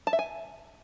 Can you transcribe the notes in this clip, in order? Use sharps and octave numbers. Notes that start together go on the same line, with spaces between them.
A5
E5
G#5